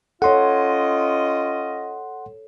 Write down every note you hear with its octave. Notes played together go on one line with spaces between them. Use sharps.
C#4 F4 A4 C#5 D#5 F#5 C6